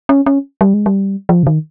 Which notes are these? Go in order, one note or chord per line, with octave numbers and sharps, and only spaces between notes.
C#4
C#4
G3
G#3
G3
F3
C#3
D#3